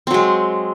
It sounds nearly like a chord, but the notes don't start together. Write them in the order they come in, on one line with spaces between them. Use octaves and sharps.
C4 F#3 G#3